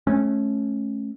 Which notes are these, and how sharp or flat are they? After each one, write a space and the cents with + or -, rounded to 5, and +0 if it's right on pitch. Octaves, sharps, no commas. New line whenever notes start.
A3 -30 C#4 -20